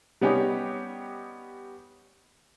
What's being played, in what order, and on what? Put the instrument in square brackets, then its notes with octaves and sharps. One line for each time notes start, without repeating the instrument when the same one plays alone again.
[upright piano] G3 B3 C#4 D#4 G4